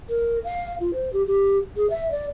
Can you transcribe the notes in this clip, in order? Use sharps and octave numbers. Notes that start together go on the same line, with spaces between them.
A#4
F5
F4
C5
G4
G4
G#4
E5
D5